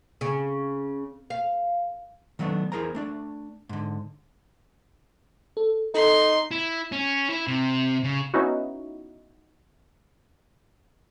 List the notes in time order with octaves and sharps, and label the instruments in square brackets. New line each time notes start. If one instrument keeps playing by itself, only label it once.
[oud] C#3
F5
[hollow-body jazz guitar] D#3 F#3 A3 B3 D4
E2 E4 G#4 A#4 C5 A#5
A3 D4 D5
G#2 D3
[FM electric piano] A4
[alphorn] D#4 [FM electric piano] A4 [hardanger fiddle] C6
[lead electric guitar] E4
C#4
E4
C3
C#3
[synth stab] B3 C#4 D#4 E4 F#4